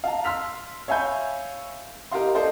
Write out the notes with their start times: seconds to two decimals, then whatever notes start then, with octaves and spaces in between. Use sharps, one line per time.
0.04 F5 A5 A#5
0.24 C6 E6 F6 B6 F7
0.88 C#5 E5 F5 G#5 B5 G6
2.12 E4 G4 A#4 D#5 F5 C6
2.35 A4 C5 D5 D#5